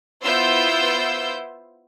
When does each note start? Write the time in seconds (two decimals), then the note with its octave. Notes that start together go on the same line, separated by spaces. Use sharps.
0.24 B3 E4 F4 C5 E6 G6